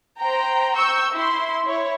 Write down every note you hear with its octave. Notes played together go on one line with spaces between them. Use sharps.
C5 G5 A#5
C#6 E6 G6
E4 C6
E4 C#5